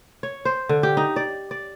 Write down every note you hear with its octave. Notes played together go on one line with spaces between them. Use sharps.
C#5
C5
D3
G4
D#4
D5
D5